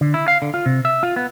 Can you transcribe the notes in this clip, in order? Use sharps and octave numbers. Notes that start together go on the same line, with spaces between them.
D3
E4
F5
D3
F4
C3
E5
F4
B3